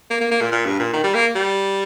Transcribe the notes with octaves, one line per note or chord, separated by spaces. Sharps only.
A#3
A#3
A#3
A#2
A#2
G2
A#2
D#3
G3
A#3
G3